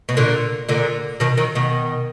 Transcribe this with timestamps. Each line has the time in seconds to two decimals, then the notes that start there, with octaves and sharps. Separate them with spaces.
0.09 B2
0.17 A#2 D3
0.69 A#2 D3
1.20 B2 D#3
1.37 D#3 F#3
1.55 B2 D#3